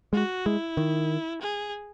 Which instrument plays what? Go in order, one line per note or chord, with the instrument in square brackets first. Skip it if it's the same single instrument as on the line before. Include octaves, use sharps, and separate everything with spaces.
[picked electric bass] G#3 [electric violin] F#4
[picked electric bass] G#3 [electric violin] E4
[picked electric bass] D#3
[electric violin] G#4